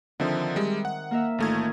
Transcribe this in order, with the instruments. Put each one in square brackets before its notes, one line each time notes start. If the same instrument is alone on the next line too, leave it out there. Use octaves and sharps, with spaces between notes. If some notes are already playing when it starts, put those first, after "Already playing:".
[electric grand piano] D3 F3 [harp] D#3 C4 E5
[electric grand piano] G3 G#3
F#5
[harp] A#3 A#4 E5
[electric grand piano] A1 A3 G#6 [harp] D#3 D#4 F4